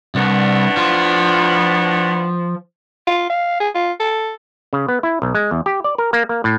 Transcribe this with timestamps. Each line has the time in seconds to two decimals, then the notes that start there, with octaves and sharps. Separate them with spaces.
0.15 C2 A2 B3 D4
0.77 F3
3.07 F4
3.30 F5
3.60 G#4
3.75 F4
4.00 A4
4.73 C#3
4.88 B3
5.03 E4
5.22 B1
5.35 G#3
5.51 E2
5.66 G4
5.84 D5
5.98 A#4
6.13 A#3
6.29 A#3
6.44 A2